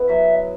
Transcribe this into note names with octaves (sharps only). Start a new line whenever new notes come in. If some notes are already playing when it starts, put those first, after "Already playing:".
Already playing: B3 E4
F#3 E5